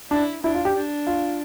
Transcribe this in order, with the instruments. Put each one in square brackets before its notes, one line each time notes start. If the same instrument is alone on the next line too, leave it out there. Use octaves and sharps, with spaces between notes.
[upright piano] D4 [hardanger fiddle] E4
[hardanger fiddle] D4 [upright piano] E4
[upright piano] F4
G4
[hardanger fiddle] D4
[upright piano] F4